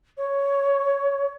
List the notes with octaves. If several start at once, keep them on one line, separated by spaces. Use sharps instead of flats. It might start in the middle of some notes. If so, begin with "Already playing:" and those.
C#5